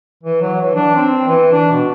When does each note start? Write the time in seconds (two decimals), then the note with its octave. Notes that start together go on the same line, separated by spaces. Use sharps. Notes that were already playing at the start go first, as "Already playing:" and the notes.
0.23 E3
0.42 F#3
0.61 E3
0.75 D4
0.96 C4
1.27 E3
1.52 D4
1.71 B2